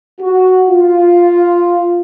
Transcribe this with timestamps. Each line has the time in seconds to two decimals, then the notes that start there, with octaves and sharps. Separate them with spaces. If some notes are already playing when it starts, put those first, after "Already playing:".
0.21 F#4
0.69 F4